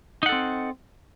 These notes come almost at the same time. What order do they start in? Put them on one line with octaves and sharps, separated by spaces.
D#4 F#5 A4 C4